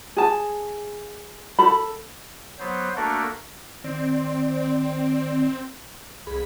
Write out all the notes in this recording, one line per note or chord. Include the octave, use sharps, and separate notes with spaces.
G#4 A5
A4 B5
F#3 B3 C5
A3 A#3 D4 F#4 A4 A#4
D#3 C4 D5
C2 G#4 B5